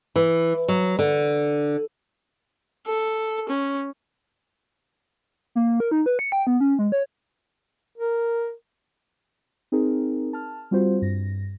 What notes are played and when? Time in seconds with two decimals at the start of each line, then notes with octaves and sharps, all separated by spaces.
0.16 E3
0.68 F#3
0.99 D3
2.86 A4
3.49 C#4
5.55 A#3
5.80 A#4
5.91 D#4
6.06 B4
6.19 C#7
6.32 G5
6.47 B3
6.60 C#4
6.79 G#3
6.92 C#5
7.98 A#4
9.72 C4 D#4 G#4 A#4
10.33 A5 F6
10.71 G3 C4 F4 F#4 C5
11.02 G2 A#6